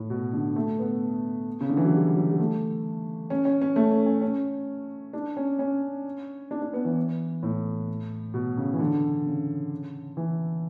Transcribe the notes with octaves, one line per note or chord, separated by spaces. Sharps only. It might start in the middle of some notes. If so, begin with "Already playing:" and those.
Already playing: A2
B2
D3
A3
B3
C#3
D3
E3
F#3
G3
F#3
G3
A3
C#4
C#4
C#4
A3
C#4
C#4
C#4
D4
C#4
C#4
D4
D4
B3
E3
A2
B2
C#3
E3
D3
C#3
E3